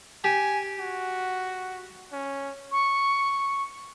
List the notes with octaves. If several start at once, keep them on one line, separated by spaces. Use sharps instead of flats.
G4 G#5
F#4
C#4
C#6